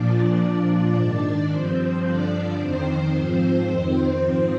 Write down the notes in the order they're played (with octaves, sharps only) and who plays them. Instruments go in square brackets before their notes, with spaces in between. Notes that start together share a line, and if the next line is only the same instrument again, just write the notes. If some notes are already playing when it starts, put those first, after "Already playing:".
Already playing: [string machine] A#2 F3 D4 D5
A#2 F3
G#2 D#3
G2 F3 C4 C5
G2 D3 F3 D4 D5
F2 D#3 C4 C5
G#2 F3 C4 C5
F2 D#3
G#2 F3